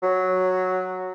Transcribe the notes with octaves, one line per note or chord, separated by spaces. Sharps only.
F#3